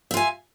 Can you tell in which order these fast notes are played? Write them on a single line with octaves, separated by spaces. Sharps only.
E5 F4 G#5